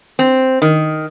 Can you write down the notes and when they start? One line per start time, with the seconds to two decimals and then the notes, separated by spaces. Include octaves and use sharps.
0.19 C4
0.62 D#3